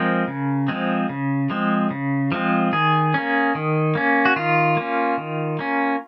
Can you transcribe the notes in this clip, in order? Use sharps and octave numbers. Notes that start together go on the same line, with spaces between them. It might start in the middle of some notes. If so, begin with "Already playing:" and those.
Already playing: F3 G#3 C4 A#4
C#3
F3 G#3 C4
C#3
F3 G#3 C4
C#3
F3 G#3 C4
D#3 G#4
A#3 C#4
D#3
A#3 C#4
F#4
D#3 F4
A#3 C#4
D#3
A#3 C#4